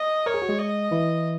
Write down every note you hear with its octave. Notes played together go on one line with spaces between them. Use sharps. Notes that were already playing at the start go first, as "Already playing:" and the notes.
Already playing: D#5
A#4 C#5
G#4
F#4
G#3 G#4
D#5
E3 E4